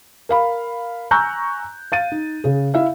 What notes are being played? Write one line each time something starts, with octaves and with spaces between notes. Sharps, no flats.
A#4 F5 B5
G#5 A#5 C#6 E6 F#6 G6
F5 A6 D#7
D#4
C#3 G#4
E4 E5 F5